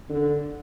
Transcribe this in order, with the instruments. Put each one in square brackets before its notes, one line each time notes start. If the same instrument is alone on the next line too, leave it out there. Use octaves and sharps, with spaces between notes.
[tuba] D3